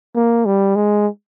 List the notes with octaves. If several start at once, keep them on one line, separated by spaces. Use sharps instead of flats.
A#3
G3
G#3